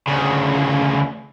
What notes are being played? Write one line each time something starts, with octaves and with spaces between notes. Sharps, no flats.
D2 C#3